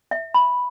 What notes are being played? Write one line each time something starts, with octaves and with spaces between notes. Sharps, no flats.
E5
B5